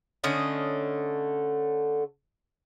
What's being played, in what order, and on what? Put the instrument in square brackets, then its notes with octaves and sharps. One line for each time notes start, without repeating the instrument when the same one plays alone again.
[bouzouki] D3 A3 C#4 D#5